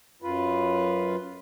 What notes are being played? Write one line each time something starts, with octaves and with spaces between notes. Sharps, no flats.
F#2 F4 B4